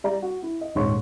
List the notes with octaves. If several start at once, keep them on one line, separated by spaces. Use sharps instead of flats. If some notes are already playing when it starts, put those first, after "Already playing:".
G3 D5 A#5
F#4
E4
D#5
D#1 G#2 C#5 C6 C#6